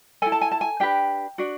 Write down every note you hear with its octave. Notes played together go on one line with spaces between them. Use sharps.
E4 A4 G#5
A5
G#5
A5
G#5
D4 G4 B4 G5
D4 F#4